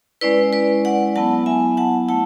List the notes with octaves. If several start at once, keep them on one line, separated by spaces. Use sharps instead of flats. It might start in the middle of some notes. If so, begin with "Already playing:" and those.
G#3 C#4 E4 B4 D5
B4 D5
D5 F#5
F#3 B3 E4 F#5 A5
E5 G#5
F#5 A5
A3 E4 F#5 A5